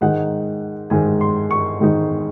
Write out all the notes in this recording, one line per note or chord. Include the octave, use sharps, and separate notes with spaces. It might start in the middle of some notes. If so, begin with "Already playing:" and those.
G#2 D#3 G#3 D#4 F#5
G#2 D#3 G#3 D#4 G#5
C6
C#6
G#2 D#3 G#3 D#4